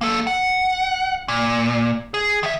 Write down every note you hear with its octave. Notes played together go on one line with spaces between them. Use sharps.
A#3 A4
F#5
A#2
G#4
D#3 E5